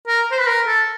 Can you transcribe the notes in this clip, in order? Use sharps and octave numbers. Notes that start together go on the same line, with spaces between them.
A#4
C5
B4
A#4
A4